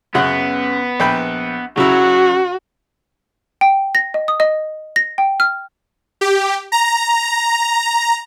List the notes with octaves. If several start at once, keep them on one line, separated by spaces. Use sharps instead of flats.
F#2 C#3 B3 F#5
A#1 G5 B5
C#3 F#3 E4 F#4
G5
A#6
D#5
D#6
D#5
A#6
G5
F6
G4
A#5